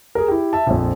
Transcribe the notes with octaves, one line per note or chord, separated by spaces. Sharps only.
G#4 A#4
E4 G4
E5 A5
A#1 F2